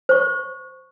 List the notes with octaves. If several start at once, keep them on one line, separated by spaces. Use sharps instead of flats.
C5 C#6